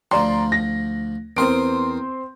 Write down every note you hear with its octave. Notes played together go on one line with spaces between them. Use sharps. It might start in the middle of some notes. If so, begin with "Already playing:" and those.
D2 F3 D5 A#5 C6
A#6
E2 C4 A#4 C6 D#6 D7